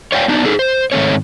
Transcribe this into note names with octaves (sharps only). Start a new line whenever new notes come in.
C#5 D5 F5 G5 G#5
B3 D4 D#4
D#4 G#4 A4
C5
G#2 D#3 A3 C4 C#5